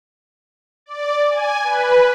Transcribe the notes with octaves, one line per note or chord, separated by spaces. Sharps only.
D5
G#5
B4